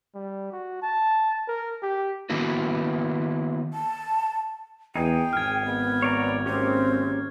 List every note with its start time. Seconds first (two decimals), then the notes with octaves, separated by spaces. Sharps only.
0.14 G3
0.52 F#4
0.82 A5
1.48 A#4
1.82 G4
2.30 D#3 A#3 B3 E4 F#4 B4
3.74 A5
4.96 E2 D#4 G#4 D#5 G5
5.33 G#1 F6 G#6
5.66 B3
6.02 C#5 D5 A#5
6.46 A#3 C4 C#4 G4